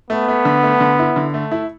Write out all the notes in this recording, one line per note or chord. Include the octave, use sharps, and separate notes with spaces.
A3 B3
A3
D3
A3
D3
E4
D3
A3
E4